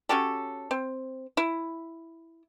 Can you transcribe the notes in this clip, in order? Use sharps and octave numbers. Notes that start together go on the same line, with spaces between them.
C#4 F#4 G4 A4
C4
E4